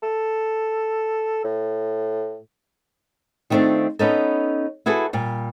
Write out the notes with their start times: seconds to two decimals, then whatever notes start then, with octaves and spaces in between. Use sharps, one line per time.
0.03 A4
1.44 A2
3.50 D#3 G3 A3 C4 D4 F4
3.99 B3 C#4 D#4 A4
4.86 E4 F#4 G#4 A4 B4
5.13 A#2 G3